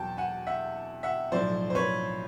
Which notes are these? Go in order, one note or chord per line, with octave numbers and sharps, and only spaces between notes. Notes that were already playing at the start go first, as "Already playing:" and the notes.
Already playing: E2 B2 F#3 G5 A5
F#5 G#5
E5 F#5
E5 F#5
B1 A2 F3 C5 D5
C5
B4 C#5